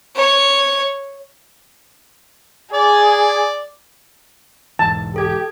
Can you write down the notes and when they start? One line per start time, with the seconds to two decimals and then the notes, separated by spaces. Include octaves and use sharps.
0.16 C#5
2.74 G#4 D5
4.79 E1 G#2 E3 A5
5.16 G4 A4 G#6